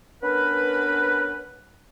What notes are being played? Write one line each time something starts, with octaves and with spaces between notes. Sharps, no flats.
B3 C#4 D4 A#4 B4